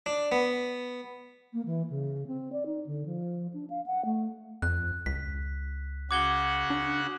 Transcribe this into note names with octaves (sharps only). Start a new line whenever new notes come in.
D4
B3
A#3
E3
C#3
C4
D5
D#4
D3
F3
D4
F5
F#5
A3
F2 F#6
C#2 B6
C#3 F#4 F#5 D6 G#6 G7
D4